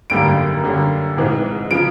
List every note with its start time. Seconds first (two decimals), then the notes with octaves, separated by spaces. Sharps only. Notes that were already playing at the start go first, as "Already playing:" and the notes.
0.10 G#1 F#2 D3 G3 A#3 D7
0.63 F#2 D3 G3 A#3 C#4
1.17 A#1 G#2 E3 G#3 C4
1.71 C#3 F3 D7